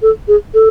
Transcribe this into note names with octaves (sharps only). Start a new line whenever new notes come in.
A4
G#4
A4